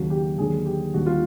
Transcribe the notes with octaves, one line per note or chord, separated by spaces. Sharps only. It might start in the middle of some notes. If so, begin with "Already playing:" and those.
Already playing: D#2 C#3 F#3 F#4
G4
D#2 D3 F#3 G#4
G4
D#2 D3 G3 F#4
F4